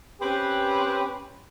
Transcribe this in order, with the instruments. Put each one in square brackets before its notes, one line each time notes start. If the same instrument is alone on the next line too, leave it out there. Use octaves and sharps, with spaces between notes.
[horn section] C4 C#4 G4 B4